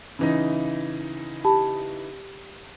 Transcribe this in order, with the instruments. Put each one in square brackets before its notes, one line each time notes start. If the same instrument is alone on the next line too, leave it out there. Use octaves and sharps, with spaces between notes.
[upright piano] C#3 E3 D#4
[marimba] G4 A5 B5